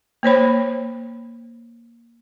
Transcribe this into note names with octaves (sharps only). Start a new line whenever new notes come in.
A#3 C5 C#5 B5